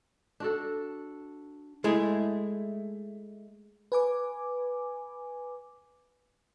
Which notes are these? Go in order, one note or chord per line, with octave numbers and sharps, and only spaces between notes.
D4 F#4 A4
G#3 A3 E4 G#4
B4 G#5 D6